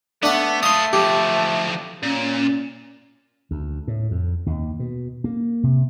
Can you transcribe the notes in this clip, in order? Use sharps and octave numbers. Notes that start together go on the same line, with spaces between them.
A3 B3 D4 F#5
A4 F5 C6 D#6
D2 F3 G4
A#2 C#4
D2
A2
F2
D#2
B2
A#3
C3